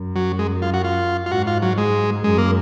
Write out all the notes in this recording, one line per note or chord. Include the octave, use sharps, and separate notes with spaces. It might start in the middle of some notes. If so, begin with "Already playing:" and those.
Already playing: F#2
F#3
G#3
F4
F#4
F4
F4
G#2 F#4
F4
F#3
G#3
F#2 G#3
A#3